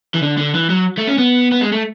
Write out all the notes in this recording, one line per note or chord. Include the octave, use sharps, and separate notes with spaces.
E3
D3
D3
E3
F#3
A3
C#4
B3
B3
G#3
A3